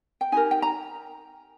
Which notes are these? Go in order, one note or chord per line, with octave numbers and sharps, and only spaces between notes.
G5
D#4 G4 A#4 G#5
G5
A#5